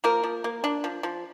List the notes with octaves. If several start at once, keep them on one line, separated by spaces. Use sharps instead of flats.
F3 A#3 A#4
F3
A#3
D4
F3
F3